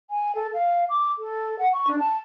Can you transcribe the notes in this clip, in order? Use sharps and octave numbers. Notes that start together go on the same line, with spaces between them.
G#5
A4
F5
D6
A4
F#5
C#6
D4
A5